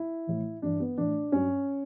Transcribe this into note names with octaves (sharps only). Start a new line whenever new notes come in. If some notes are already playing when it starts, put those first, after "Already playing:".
Already playing: E4
A2 E3
G2 E3 D4
B3
A2 E3 D4
G2 F#3 C#4